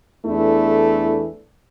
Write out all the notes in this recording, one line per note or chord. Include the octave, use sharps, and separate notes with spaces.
E2 E3 A3 D4 E4 A4